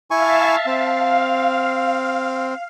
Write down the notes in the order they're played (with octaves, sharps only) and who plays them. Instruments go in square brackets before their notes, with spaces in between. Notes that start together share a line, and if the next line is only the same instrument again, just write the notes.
[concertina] E4 G#5 C#6 [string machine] E5 F5 A5
[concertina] C4 [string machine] F5